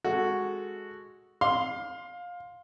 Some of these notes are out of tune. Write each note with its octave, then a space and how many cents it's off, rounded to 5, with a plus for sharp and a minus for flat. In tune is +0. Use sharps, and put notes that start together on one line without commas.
G#3 +0 F#4 +0 A4 +0
F5 +20 C6 +0